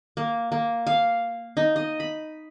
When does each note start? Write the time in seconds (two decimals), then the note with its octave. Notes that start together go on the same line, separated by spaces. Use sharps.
0.17 A#3
0.52 A#3
0.87 F5
1.57 D#4
1.76 D#5
2.00 B5